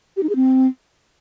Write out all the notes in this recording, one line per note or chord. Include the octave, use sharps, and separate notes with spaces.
G4
D#4
G#4
C4